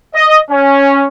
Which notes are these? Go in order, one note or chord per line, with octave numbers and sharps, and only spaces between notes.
D#5
C#4